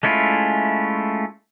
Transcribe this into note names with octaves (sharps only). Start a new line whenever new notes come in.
G#3 A3 C#4 E4 F4